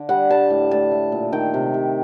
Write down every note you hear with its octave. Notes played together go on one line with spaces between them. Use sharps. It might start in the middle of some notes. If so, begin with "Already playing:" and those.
Already playing: D3
G3 F#5
G3 A5
A2
A3 A5
A3
A#2
D#3 G5
C3
C3